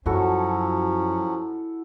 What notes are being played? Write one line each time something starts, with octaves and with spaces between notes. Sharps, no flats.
F#2 F3 F#3 C#4 E4 F#4 A4